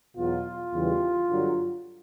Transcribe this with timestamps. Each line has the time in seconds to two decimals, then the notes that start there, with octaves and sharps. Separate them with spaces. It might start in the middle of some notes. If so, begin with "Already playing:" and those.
0.17 E2 B2 F#3 F4
0.73 E2 C#3 E3 G3
1.28 G2 D3 F#3